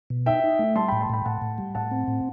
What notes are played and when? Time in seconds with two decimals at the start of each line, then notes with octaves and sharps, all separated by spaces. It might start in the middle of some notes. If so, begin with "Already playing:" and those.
0.10 B2
0.26 D#4 E5 G5
0.44 D#4
0.59 A3
0.76 G3 A5 C6
0.88 A2 G5 B5
1.00 A5 C6
1.10 A2 G5 B5
1.25 A2 F#5 A5
1.42 A2
1.58 G3
1.75 A2 F#5 A5
1.91 C4
2.08 A2